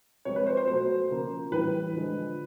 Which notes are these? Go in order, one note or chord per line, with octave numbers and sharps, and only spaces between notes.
C3 F3 G#3 C#5
B4
C5
C5
B2 F#3 A3 C5
C#3 F3 A#3
A2 E3 G3 B4
D3 F3 G#3